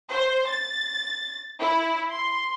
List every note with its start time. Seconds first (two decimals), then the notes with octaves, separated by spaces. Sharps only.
0.12 C5
0.49 A6
1.61 E4
2.12 C6